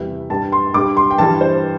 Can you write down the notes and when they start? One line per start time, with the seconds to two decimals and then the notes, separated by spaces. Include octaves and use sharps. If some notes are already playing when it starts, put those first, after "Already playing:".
Already playing: E2 C3 E3 G3 E5
0.30 G2 G3 A5
0.52 C6
0.74 G2 G3 D6
0.97 C6
1.11 G5
1.18 G2 E3 G3 A5
1.41 C5